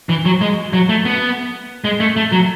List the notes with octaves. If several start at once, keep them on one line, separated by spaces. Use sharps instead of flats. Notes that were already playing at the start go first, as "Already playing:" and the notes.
E3
F#3
G#3
F#3
A3
B3
G#3
A3
A3
F#3